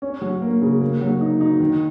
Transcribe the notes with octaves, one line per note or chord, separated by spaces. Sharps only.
C#4
F#3
A#3
C#3
A#3
F#3
D#4
D#4
D#3